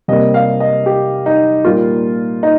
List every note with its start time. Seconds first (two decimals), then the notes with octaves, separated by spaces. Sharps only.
0.08 C3 G3 A#3 D#5
0.34 F5
0.60 D#5
0.86 G4
1.26 D#4
1.65 A#2 G3 A#3 F4
2.43 D#4